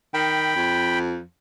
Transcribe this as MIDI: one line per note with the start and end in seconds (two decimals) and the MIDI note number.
0.14 0.54 51
0.14 0.99 79
0.14 0.99 83
0.56 1.22 41